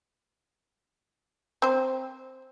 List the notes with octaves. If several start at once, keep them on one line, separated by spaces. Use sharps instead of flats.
C4 C5